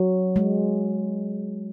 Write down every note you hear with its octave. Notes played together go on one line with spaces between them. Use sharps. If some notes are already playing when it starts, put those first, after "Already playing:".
Already playing: F#3
G#3